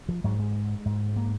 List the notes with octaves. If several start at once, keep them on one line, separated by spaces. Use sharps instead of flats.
F3
G#2 F#3
G#3
G#2
A#3